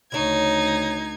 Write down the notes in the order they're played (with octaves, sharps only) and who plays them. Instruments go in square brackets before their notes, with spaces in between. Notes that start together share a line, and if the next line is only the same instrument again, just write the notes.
[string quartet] D2 D#4 G#6 [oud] C#3 C#5